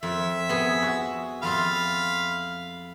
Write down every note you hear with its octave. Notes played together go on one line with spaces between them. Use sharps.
F2 E5
B3 G#4
F#4
F2 F4 E5 F5 B5